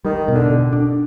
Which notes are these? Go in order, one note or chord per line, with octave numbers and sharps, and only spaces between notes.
D#3 G3
B2
D3
B2
D4